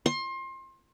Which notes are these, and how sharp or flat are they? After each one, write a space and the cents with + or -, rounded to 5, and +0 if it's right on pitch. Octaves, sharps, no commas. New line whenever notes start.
C6 +30